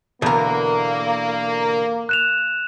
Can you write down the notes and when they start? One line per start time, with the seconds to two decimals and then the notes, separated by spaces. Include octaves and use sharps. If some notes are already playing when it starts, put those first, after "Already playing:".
0.22 E2 B2 D3 A#3 A#4
2.09 F#6 E7 F7